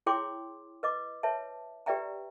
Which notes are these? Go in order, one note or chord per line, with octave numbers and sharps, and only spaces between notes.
E4 G#4 C#5 G5 C6 D6
B4 D#5 D6
B4 C#5 E5 A5
G4 B4 D5 E5 G5 A#5